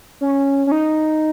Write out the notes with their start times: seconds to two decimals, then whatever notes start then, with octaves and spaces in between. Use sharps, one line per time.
0.21 C#4
0.67 C#4
0.72 D#4